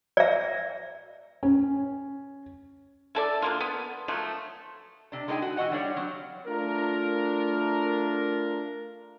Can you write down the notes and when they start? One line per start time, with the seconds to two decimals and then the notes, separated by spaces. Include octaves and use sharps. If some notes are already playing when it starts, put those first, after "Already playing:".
0.17 D5 E5
1.43 C#4
3.15 E4 A4 D5
3.42 D3 A#3 F4
3.61 B3
4.08 F3 F#3 A3
5.12 C3 D4
5.28 G#3 D#4 A4 A#4 G5 G#5
5.42 F#4
5.57 B2 E3 F#4 D#5 F#5
5.71 G3 D4 C#5 F5
5.96 F#3 C4
6.47 A3 D4 F4 A#4